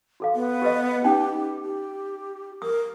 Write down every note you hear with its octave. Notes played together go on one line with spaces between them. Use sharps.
F#4 A4 F5
B3
G4 B4 D#5
C#4 D#4 G4 G5
G4
A#4 D#6